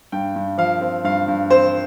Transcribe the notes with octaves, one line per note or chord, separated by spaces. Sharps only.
G2 G5
G2
F3 F5
C4
G2 F5
G2
C4 C5